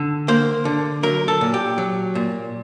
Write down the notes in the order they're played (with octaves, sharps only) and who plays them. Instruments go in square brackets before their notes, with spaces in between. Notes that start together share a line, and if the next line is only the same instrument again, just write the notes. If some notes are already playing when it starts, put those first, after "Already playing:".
Already playing: [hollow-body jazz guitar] D3
A#3 C5
D3
F#3 A#4
A4
A#2
G4
F#3
A#2